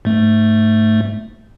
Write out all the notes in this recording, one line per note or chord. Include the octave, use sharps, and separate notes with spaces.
G#2 A3